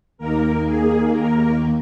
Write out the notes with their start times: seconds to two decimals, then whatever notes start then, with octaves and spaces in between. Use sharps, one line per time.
0.18 D#2 D#3 A#3 A#4
0.65 G#4
1.11 A#4